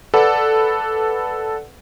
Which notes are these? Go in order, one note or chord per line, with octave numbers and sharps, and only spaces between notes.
A4 B4 D5 F#5